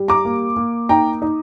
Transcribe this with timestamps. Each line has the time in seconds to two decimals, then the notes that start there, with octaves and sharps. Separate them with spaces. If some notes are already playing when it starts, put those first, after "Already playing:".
Already playing: G3
0.08 A#5 D6
0.25 A#3
0.56 A#3
0.89 D#4 G5 A#5
1.22 D#4